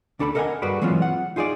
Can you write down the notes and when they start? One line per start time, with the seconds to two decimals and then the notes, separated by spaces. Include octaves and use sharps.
0.19 D2 D4 A4 A#5 B5
0.35 A4 A#4 D#5 E5 F#5 G#5
0.62 G2 F#4 G#4 B4 D5 B5
0.82 E3 F#3 G#3 B3 C4 F4
1.02 F#5
1.36 D#4 F4 G#4 C#5 D5